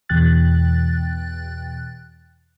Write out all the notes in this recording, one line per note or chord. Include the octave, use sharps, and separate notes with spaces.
E2 B2 E3 G5 F#6 A6